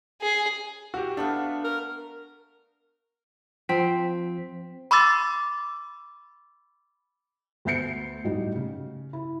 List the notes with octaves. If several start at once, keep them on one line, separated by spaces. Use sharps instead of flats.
G#4
F#4 G4
A3 B3 D4 F5
A#4
F3 C4 B6
B5 C6 D6 E6 A6
D2 B3 E5 G6 C7 C#7
A2 F#3 G3 D#4
C#3
E4